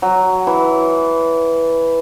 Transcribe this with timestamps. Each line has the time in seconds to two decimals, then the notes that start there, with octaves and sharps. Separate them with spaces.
0.02 F#3
0.47 E3